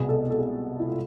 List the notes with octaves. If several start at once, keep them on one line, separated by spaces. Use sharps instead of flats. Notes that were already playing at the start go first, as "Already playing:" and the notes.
Already playing: C2 B2 B3 G#4
A4
A4
G#4
E4
F4